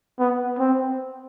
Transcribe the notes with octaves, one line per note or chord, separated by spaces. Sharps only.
B3
C4